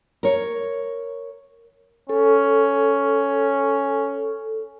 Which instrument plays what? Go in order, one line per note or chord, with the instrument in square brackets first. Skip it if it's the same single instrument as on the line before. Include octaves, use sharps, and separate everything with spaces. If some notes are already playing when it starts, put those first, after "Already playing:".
[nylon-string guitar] A#4 C#5
[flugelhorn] C#4 [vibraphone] A4